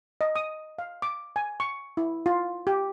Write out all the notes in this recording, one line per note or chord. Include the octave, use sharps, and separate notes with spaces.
D#5
D#6
F5
D6
G#5
C#6
E4
F4
G4